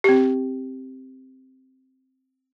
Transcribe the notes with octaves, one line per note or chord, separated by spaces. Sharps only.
C4 G4